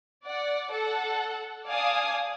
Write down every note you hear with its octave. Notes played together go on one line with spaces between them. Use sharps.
D5 F#5
A4 F#5
D5 F5 G#5 A5 D#6